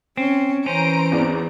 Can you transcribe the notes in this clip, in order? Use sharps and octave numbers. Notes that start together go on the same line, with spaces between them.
C4 C#4
E3 C#4 C5 A#5 D7
G#1 E2 D5